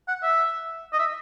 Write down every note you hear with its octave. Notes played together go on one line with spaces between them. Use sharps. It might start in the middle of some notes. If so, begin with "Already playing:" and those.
F#5
E5
D#5
E5